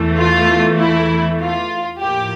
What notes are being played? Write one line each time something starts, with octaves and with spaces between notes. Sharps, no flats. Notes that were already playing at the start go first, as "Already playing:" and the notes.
Already playing: E2 E3 A3
F4
E4
F4
A2 F3 A#3 G4